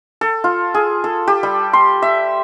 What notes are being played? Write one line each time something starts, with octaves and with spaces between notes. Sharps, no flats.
A4
F4
G#4
A4
G4
G3
C6
E5